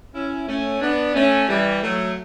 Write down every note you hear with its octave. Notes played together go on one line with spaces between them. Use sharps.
C#4 E4
A3 C#4
B3 D4
A3 C#4
E3 G3
F#3 A3